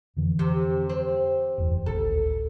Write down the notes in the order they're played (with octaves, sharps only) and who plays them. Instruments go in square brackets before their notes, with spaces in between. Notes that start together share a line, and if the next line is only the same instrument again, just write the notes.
[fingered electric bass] F2 D3 E3
[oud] C3
C4
[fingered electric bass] F#1 E2
[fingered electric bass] D1 G#1 [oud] A4